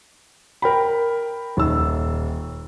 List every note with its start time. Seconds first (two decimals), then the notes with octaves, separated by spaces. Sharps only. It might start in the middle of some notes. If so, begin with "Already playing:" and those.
0.62 A#4 G5 B5
1.57 D#1 E6